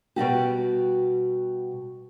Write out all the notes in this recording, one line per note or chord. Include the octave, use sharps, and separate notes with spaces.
B2 G3 F#4 G4